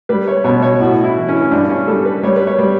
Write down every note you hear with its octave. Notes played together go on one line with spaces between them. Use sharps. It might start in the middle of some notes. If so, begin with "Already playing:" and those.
G3 B4
C#5
B2 C#5
C#5
A2 F#4
E4
E3
C#4
C#4
G2 D4
C#4
G3 A4
B4
G3 C#5
B4
C#5
G3